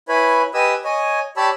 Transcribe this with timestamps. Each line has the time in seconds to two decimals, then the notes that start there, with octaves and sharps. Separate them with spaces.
0.09 E4 B4 C#5 G#5 B5
0.54 G4 B4 D#5 G#5 D#6 E6
0.84 C#5 D#5 G#5
1.37 G4 C#5 D5 A5 B5 E6